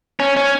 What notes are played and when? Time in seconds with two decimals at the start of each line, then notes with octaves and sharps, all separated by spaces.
0.20 C#4
0.37 C#4